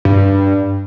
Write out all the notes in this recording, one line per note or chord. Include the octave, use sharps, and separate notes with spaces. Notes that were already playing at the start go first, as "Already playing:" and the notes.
G2